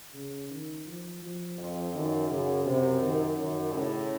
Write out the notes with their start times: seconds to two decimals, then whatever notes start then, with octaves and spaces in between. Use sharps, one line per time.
0.14 C#3
0.50 D#3
0.86 F3
1.22 F3
1.58 F2
1.94 F#2 D#3
2.30 F#2 C#3
2.66 F#2 C3
3.02 D#3
3.38 F#2 D#3
3.74 A2 C#3